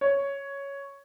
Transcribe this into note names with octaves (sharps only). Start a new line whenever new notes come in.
C#5